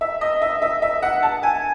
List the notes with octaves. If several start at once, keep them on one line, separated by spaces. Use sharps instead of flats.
E5
D#5
E5
E5
E5
F#5
A5
G#5